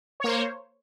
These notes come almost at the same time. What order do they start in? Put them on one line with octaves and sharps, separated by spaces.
C#5 A#3 C5